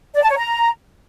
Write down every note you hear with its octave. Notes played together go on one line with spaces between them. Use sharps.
D5
A5
C#5
A#5